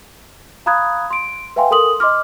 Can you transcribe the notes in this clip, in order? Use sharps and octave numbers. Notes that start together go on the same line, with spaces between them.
F5 A#5 B5 D#6 F#6 G#6
C6 D7
B4 E5 F5 G5 G#5 C6
A4 A#4 C6 D#6 F#7
D#5 C6 D6 F6